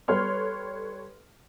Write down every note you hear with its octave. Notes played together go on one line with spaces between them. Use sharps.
G3 A4 B4 C#5 C6 F6